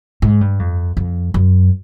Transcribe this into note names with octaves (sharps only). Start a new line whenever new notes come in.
G#2
G2
F2
F2
F#2